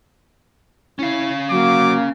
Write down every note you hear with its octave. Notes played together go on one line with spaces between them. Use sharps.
C#4 E4 F5
F#3 A#3 D6